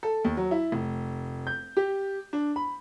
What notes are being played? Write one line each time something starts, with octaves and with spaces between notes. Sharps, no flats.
A4
D#2
F#3
E4
F1
G6
G4
D4
B5